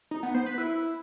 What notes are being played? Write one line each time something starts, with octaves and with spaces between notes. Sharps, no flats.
D#4
B3
C5
B4
E4